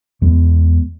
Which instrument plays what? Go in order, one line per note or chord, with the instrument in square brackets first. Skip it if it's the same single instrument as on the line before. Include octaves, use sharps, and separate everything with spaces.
[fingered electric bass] E2 G#3 A3 B3